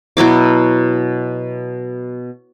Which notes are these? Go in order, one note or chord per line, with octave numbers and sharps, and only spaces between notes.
B2 F#3 E4 D6